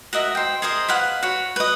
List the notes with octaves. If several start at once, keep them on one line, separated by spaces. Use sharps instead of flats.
F#4 A#4 D#5 E5
C5 G5
G#4 A#4 C5 D#5
B4 F5 F#5
F#4 C#5
B4 D#5